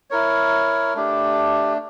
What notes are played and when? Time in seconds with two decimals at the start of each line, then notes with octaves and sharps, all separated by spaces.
0.11 E4 A#4 C#5
0.94 A3 D4 G4